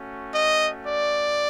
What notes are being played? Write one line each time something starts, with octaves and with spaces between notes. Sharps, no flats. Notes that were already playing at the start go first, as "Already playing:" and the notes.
Already playing: A3 C#4 F#4
D#5
D5